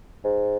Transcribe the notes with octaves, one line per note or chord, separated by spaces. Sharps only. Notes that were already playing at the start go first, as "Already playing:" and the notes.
G#2